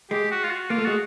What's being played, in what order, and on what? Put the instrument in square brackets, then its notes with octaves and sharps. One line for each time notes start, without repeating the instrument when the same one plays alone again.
[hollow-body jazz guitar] G#3 [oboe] G4
[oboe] F#4
F4
F#4
[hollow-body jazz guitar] A#3 [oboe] F4
[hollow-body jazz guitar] A3
[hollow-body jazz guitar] G#3 [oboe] F#4